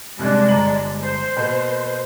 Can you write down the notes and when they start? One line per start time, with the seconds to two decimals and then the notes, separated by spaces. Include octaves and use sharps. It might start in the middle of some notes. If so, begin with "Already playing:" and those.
0.19 C2 G#3 D4 F#6
0.48 G1 A#5 F#7
1.01 C5
1.37 B2 A#3